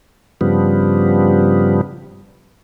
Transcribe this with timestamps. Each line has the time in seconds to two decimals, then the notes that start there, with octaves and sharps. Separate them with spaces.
0.41 G2 C#3 F3 G3 B3